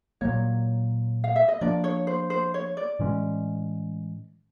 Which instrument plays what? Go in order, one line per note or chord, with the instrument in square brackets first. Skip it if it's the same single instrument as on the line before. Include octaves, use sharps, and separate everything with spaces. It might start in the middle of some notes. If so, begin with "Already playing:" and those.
[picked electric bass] A#2 F#3 A#3 [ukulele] C#5
[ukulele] F5
E5
D#5
[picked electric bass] F3 A#3 D4 [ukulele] D5
[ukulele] C#5
C5
C5
C#5
D5
[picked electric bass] A2 E3 G#3 C#4